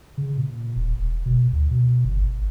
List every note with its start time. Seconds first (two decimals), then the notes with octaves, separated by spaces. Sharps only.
0.18 C#3
0.37 A#2
0.76 D#1
0.96 E1
1.26 B2
1.53 D2
1.71 B2
2.05 G1
2.21 G#1